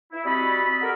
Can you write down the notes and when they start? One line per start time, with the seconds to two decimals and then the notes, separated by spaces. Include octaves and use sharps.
0.11 E4
0.24 G3 C4 F#4 A4 D#5 B5
0.81 F#4 G4 A4 A#4